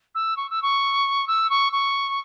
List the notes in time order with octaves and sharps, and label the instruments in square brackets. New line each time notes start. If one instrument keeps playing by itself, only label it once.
[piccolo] E6
C#6
E6
C#6
E6
C#6
C#6